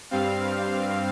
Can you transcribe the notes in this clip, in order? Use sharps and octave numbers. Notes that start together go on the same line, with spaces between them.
G2 G3 C4 F5